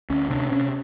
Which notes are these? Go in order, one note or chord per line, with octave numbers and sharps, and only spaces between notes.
D2 C#4
C3 D4
C3 C#4